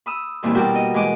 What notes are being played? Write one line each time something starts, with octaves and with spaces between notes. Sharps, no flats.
B5 D#6 E6
F2 A#2 E3 G3 C4 E4
B2 G3 F#4 A#4 D5 G5
D#5
E3 G#3 D#5 D6